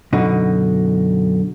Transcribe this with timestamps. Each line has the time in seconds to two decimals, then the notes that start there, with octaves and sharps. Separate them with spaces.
0.13 F#2 B2 D3 D#4